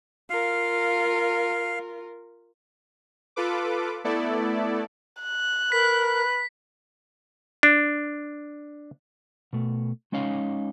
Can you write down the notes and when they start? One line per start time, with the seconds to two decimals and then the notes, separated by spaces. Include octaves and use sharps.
0.30 F4 A#4 F5
3.36 F4 A4 B4 D6
4.04 A3 B3 E4 A4 D5
5.22 F#6
5.72 A#4 B4 B6
7.63 D4
9.53 B2 A3
10.12 G#3 C#4 D#4 C#5 F5